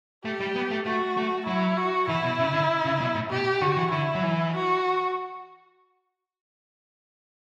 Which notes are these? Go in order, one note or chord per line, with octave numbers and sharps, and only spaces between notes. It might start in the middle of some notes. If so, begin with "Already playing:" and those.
A3 G4
G3
B3
A3
A3 F#4
A3
F#3 E4
F#4
E3 E4
B2
C#3
D3
C#3
B2
A2
B2 G4
D3 F#4
E3
D3 E4
F#3
E3
F#4